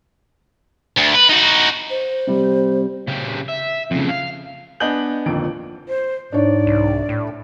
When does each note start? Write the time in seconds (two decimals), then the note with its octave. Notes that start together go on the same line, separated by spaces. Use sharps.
0.97 D2
1.14 B4
1.29 D#4 F#4
1.90 C5
2.27 C3 G3
3.08 C#3 G4
3.48 E5
3.91 F2 C#3
4.09 F5
4.80 B3 D4 D#5 G#5 G6 F#7
5.26 G1 F2 A#2 D#3 D7
5.88 C5
6.33 G#2 D4 C#5 D5
6.67 C2
7.09 A2